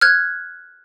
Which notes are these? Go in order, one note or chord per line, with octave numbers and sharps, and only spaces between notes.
F6 F#6 G#6